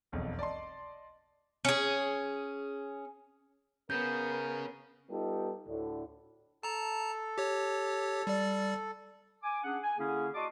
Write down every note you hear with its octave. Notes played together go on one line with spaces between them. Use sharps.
E1 B1 F2
D5 D#5 A5 C6
C#4 G#4
B3 C#4 G#4 A#4 G6
G3 B3 D#4 F4 G4 A4
D2 A2 D3
A4 A5 A#5
G4 C#5
G3 D5
G#5 D6
C#4 D4 G#4 F#5
G#5
D3 A#3 C#4 E4 G#4
F#4 D5 D#5 A5 C6 D6